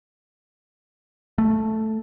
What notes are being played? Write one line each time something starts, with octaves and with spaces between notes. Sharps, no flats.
A3